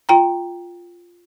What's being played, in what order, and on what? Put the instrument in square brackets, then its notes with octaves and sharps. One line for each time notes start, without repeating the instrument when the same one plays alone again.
[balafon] F4 G5 A#5